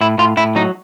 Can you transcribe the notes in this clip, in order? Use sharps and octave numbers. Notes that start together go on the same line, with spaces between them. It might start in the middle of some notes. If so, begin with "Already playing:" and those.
A2 E4
A2 F4
A2 E4
F#3 D#4